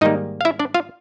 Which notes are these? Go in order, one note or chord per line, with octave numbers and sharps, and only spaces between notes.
G#2 D#3 G3 A#3 D#4 D#5
F5
E4 E5
D4 D5
F4 F5